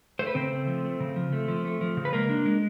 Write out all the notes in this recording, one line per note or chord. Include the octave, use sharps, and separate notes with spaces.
A3 C5
B4
C#3 C4 C5
A3
F3
A3
C#3
F3
A3
F3
A3
F3
C#3
B4
G#3 A#3 A#4
D4
G#3